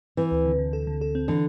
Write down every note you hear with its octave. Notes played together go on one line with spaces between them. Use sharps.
E3 C4
D2
D3
D3
A4
D3
A4
C4
D3 E3